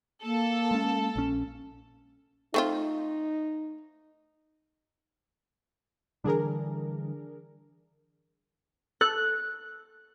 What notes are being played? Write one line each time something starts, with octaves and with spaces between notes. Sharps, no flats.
A#3 A4
G#3 C#4
A#1 C#4
A3 C4 D#4 F4
D3 E3 G3 D4 G#4 A#4
A4 F#6